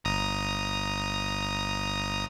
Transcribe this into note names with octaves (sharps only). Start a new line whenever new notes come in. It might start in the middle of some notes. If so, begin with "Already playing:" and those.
G1 A#5 D#6